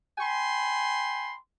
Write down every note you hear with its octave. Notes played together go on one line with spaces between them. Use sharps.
G5 G#5 B5 C6